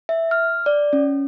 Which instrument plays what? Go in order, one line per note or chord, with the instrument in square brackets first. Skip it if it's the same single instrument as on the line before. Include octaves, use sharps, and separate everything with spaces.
[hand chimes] E5
F6
D5
C#4